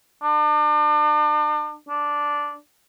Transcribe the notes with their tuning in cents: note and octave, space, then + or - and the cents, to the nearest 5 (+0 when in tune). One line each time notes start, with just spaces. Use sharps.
D4 +35
D4 -5